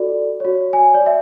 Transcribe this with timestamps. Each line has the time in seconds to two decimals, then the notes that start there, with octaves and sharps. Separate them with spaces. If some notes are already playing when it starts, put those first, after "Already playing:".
Already playing: F#4 A4 D5
0.40 F#4 C#5
0.73 G#5
0.94 D5
1.06 E5